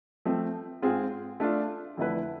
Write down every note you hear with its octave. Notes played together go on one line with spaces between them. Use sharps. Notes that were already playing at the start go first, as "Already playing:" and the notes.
F3 A3 C4
G#2 G#3 C4 F4 G#4
A3 D4 F4
F2 D3 A3 E4 B4